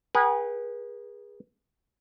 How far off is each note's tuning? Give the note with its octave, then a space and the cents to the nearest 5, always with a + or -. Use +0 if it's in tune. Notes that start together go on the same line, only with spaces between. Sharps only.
G#4 -20 B4 -40 F#5 +30